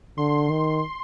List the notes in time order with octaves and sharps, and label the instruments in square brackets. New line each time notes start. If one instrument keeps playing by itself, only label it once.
[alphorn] D3 [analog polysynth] C6
[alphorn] D#3